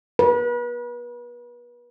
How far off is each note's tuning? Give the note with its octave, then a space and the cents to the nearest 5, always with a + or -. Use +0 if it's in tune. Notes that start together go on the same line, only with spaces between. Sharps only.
B4 -35